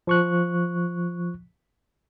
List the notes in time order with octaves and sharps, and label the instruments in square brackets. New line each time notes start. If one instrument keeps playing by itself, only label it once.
[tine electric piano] F3 C#6 F#6